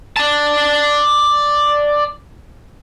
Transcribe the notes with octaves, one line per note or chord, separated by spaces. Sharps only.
D5 A5